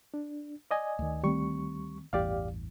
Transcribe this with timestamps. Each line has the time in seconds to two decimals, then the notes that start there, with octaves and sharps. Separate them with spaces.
0.14 D4
0.71 D5 D#5 G#5
0.99 D2 D#3
1.23 D2 D#3 G3 A3 C4 C#6
2.13 A1 E2 G2 G4 D5 F5